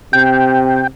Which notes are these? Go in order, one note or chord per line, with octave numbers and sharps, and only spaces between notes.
C3 G5